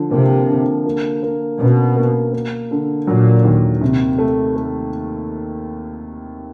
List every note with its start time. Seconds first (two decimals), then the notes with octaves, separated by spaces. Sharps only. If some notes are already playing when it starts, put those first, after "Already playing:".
Already playing: D3 F3
0.10 C3 A#3
0.49 D3
0.86 A#3
1.23 A#3
1.59 B2 C#4
1.96 A#3
2.33 A#3
2.71 D3
3.07 A#2 F#3
3.45 D#2
3.81 C3
4.18 A3
4.56 A3